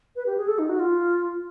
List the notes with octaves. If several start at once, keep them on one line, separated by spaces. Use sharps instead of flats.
B4
G4
G#4
A4
D#4
F#4
F4